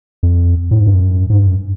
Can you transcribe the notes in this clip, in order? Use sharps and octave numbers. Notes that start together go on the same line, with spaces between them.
F2
A2
G#2
G2
F#2
G#2
G2
F#2